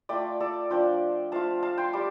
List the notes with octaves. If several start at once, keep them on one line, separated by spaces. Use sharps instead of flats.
A3 F4 D5 G5
A4 D5
F3 D4 F4 D5 G5
F3 A3 F4 F5 A5
F5 A5
G5 C6
G3 A5 D6